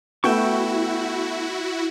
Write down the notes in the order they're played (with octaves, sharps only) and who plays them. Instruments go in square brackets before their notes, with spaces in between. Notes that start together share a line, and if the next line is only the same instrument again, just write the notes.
[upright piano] A3 B3 [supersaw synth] E4 F#4 [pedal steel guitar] E5 G5 C#6